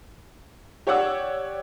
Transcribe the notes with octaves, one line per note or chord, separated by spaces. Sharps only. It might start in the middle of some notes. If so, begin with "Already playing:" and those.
G4 C#5 D5 F#5 D6 E6